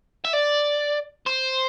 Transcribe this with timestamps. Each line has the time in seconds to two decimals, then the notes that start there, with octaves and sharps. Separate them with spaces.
0.25 E5
0.34 D5
1.27 C5